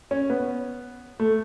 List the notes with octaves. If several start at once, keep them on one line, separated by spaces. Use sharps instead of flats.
C#4
B3
A3